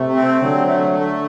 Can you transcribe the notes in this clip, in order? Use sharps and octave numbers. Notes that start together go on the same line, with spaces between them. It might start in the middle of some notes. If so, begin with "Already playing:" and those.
Already playing: C3 A3
C4
D3 F#3
A3
A3